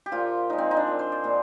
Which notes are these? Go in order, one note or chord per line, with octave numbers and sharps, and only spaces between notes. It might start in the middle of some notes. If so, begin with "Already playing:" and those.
G4
A#2 F3 A#3 F4
A#2 F3 G#3 D#4
C4
D#4
D4
A#2 G#3
C5
D5
A#2 G3 A#3